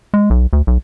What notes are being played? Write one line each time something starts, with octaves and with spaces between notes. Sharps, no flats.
G#3
B1
D2
B1